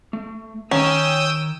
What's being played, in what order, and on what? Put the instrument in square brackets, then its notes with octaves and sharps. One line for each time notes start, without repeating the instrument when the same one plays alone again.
[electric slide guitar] A3
[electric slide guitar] D#3 A#5 [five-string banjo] C#4 [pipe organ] G5 D#6 E6